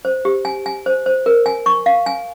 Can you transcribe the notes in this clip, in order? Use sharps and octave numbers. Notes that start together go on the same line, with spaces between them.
C5
G4
G#5
G#5
C5
C5
A#4
G#5
C#6
F5
G#5